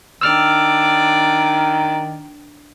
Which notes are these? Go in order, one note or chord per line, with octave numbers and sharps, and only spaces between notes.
D#3 D4 D5 E6 F6